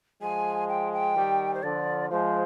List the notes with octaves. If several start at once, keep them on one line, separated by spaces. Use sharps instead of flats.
F3 G#3 G#5
G5
G5
D#3 G3
C5
D3 F3 D5
F3 G#3 C5